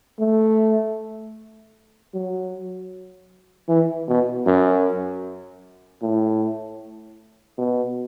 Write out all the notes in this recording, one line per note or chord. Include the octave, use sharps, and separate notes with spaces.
A3
F#3
E3
B2
F#2
A2
B2